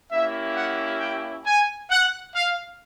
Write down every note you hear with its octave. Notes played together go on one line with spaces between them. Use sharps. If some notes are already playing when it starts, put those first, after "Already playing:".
A#3 C#4 E4 G4 E5
F#5
G5
G#5
F#5
F5